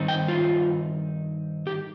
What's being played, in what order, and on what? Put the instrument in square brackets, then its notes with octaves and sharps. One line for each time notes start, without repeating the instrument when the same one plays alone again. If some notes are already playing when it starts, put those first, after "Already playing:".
Already playing: [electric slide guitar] G2 D#3 C4 D#4
G5
F4
G4